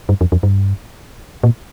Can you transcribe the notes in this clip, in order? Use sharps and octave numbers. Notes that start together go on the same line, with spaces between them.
G2
F2
F2
G2
A#2